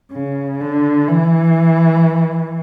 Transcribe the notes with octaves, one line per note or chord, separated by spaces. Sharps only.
C#3
D3
E3